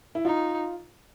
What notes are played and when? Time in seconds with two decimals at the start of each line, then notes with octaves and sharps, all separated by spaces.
0.15 E4
0.25 D#4 F4